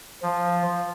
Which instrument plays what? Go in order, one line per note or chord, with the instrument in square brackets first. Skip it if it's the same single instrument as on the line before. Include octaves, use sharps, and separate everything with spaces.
[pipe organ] F3